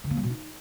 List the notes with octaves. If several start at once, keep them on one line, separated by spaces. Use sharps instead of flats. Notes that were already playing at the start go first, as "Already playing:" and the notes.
D3
A#3
G3
B2
D#4